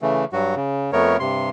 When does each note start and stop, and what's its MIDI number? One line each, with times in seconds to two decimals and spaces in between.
0.02 0.25 49
0.02 0.25 52
0.02 0.25 57
0.33 0.55 43
0.33 0.55 54
0.33 0.55 66
0.56 0.91 49
0.93 1.17 41
0.93 1.17 57
0.93 1.17 59
0.93 1.17 70
0.93 1.17 73
1.20 1.50 43
1.20 1.50 48
1.20 1.50 84